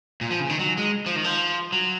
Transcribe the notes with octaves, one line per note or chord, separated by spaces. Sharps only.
A#2
F3
C#3
D#3
F#3
G#3
F3
D#3
F3
F#3